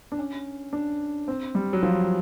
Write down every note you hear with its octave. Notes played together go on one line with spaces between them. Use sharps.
D4
C#4
D4
C4
G3
F#3
F3